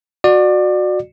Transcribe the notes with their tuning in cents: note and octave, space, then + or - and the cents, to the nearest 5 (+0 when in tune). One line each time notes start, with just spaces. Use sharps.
F#4 -15 D5 +25